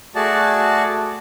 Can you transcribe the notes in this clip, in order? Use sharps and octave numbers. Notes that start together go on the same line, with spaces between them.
A3 F#4 G#4 D5 A5